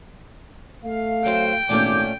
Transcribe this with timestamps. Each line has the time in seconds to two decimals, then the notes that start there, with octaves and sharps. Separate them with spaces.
0.84 A3 F5
1.25 F#3 C4 C5 G5
1.69 G#1 A#2 A3 C#4 D6 G6